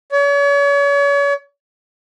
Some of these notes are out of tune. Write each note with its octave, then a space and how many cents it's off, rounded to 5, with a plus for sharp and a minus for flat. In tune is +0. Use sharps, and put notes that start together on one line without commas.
C#5 +40